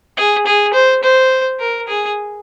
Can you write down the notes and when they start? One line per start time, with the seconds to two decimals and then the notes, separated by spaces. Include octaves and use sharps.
0.17 G#4
0.46 G#4
0.74 C5
1.03 C5
1.60 A#4
1.88 G#4